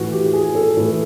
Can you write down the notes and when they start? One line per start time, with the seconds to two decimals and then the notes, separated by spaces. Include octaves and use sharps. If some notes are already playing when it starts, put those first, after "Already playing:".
Already playing: A2 E3 F#4
0.12 G4
0.26 G4
0.33 G#4
0.55 A4
0.77 A2 E3 A4